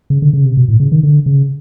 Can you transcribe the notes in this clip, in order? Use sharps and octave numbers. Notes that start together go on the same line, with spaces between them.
C#3
D3
C#3
C3
B2
A2
C#3
D#3
D3
C#3